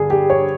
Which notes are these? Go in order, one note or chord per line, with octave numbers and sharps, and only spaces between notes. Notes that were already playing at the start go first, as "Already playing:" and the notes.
Already playing: G2 D3 G#4
G4
C#5